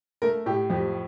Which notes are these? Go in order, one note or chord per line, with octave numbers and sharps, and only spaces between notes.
A3 A#4
A2 G4
F2 G4